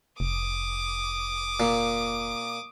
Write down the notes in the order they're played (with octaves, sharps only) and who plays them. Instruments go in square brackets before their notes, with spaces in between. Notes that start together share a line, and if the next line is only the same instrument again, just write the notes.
[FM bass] F1 [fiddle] D6 D#6
[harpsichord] A#2